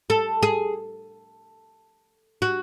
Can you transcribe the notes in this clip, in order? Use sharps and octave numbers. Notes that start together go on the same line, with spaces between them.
A4
G#4
F#4